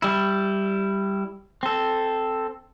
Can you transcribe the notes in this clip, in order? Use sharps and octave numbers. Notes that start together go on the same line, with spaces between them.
G3 E4
C4 A4